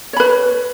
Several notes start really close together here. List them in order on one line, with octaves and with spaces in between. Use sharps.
C#5 B5 B4